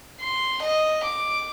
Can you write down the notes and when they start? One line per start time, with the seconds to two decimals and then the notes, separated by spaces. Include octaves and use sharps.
0.21 C6
0.62 D#5
1.03 D6